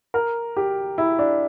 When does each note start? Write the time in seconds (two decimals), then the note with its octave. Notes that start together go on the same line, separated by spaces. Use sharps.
0.14 A#4
0.57 G4
0.98 E4
1.19 D4